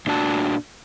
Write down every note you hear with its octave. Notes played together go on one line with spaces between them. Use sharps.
A#2 D4 F#4 A5